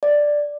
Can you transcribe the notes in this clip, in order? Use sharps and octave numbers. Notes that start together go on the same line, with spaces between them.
D5